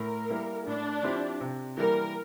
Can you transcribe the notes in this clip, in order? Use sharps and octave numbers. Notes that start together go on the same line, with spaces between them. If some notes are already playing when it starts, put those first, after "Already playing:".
Already playing: A2 A#4
G3 A#3 E4
A2 D4
F3 C4 E4 G4
C3
E3 G3 A#3 A#4